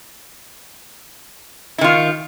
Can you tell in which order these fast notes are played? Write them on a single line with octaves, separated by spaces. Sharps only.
E4 D#3 F4